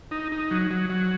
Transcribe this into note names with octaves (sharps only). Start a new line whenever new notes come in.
D#4
D#4
F#3
F#3
F#3